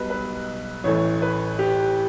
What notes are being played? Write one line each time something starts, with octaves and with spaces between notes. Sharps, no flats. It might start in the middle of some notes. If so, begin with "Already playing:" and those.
Already playing: B1 B2 G3 B4
B4
A1 A2 E3 A3 C#5
B4
G4